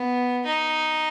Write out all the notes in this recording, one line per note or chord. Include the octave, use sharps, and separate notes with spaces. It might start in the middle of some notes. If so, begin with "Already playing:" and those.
Already playing: B3
D#4